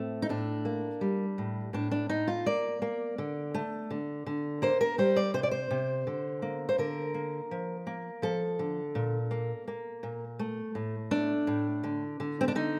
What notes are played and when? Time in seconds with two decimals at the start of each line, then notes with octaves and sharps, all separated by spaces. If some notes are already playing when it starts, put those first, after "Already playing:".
Already playing: A2 A3 C4
0.22 D#4
0.29 A2 D4
0.65 A#3
1.01 G3
1.38 A2
1.73 A2 D4
1.91 D4
2.09 A2 D#4
2.28 F4
2.46 A#3 D5
2.82 A#3
3.18 D3
3.54 A3
3.91 D3
4.26 D3
4.62 A#3 C5
4.81 A#4
4.98 G3 C5
5.16 D5
5.34 C3 C5
5.43 D5
5.51 C5
5.71 C3
6.07 D3
6.42 A#3
6.69 C5
6.78 D3 A#4
7.14 A#3
7.51 F3
7.87 A#3
8.22 F3 A4
8.59 D3
8.95 A#2
9.31 A#3
9.68 A#3
10.03 A#2
10.39 A3
10.75 A2
11.11 A3 D4
11.47 A2
11.84 D3
12.20 D3
12.41 C4
12.48 D4
12.55 D3 D#4